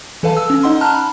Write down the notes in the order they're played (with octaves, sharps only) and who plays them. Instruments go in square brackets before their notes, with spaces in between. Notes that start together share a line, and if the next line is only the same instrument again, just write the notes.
[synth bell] E3 A4 B4 F5 A5
E6
C#4
D#4 D#5 F#5 C6
A5 A#5 F6 F#6
B5